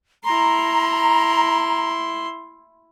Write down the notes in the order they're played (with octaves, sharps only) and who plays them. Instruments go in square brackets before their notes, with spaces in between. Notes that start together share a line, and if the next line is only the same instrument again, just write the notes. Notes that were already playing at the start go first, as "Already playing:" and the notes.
[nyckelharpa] E4 C6 [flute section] A#5